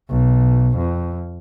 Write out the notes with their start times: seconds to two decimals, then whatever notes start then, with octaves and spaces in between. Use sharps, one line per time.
0.10 B1
0.77 F2